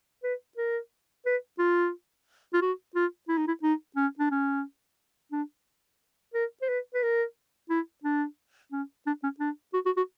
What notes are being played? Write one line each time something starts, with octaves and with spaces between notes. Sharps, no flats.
B4
A#4
B4
F4
F4
F#4
F4
E4
D#4
E4
D#4
C#4
D4
C#4
D4
A#4
C5
B4
B4
A#4
E4
D4
C#4
D4
C#4
D4
F#4
F#4
F#4